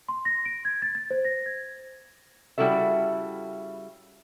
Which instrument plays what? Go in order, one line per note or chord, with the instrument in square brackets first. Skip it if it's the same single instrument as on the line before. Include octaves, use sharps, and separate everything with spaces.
[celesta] C6
A#6
D7
G#6
A6
A6
C5
A#6
G#6
[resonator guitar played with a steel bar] C#3 G3 E4 F#4 A4 E5